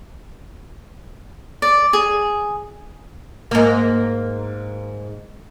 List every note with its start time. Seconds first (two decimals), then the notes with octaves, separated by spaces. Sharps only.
1.62 D5
1.93 G#4
3.51 G#2 A#3